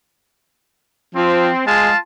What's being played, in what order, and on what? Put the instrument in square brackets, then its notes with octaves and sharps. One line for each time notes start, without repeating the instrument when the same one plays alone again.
[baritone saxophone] F3 [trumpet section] C4
[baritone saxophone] G#3 [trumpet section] F4 F5 A5